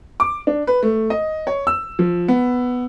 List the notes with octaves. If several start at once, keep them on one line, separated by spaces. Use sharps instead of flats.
D6
D4
B4
A3
D#5
C#5
E6
F3
B3